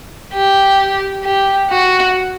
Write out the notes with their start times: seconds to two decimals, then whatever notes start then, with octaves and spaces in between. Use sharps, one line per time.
0.33 G4
1.23 G4
1.69 F#4